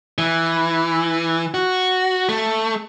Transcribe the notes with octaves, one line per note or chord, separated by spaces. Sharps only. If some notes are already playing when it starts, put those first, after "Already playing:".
E3
F#4
A3